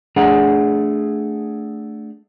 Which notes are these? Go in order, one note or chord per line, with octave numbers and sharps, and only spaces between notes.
A3 D4 G#4 F#5 A#5